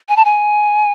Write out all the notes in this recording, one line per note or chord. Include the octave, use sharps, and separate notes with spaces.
G#5
A5
G#5